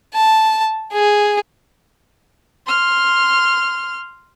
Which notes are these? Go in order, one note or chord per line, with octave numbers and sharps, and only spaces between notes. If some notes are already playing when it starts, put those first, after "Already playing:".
A5
G#4
C6 F6